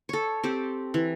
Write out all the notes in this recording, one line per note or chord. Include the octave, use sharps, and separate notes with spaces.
A4 C#5
C4 G4 A4
E3